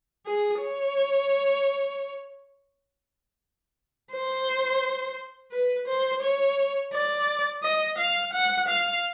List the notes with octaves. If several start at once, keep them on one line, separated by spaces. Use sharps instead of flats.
G#4
C#5
C5
B4
C5
C#5
D5
D#5
F5
F#5
F5